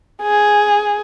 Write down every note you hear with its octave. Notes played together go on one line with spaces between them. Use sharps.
G#4